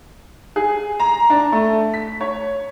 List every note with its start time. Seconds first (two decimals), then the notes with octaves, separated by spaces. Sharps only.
0.56 G#4
1.00 A#5
1.30 D4
1.52 A3
1.94 B6
2.21 C#5